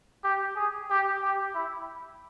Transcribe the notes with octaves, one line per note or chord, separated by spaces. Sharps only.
G4
G#4
G4
G4
E4